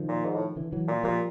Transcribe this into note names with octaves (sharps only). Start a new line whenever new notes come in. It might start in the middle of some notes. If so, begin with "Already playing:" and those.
Already playing: D#3 F3
A#2
G#2
A2
D3 E3
E3 F#3
A#2
A#2 F3 G3